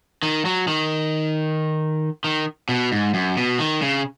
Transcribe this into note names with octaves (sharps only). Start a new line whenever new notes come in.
D#3
F#3
D#3
D#3
B2
G#2
F#2
B2
D#3
C#3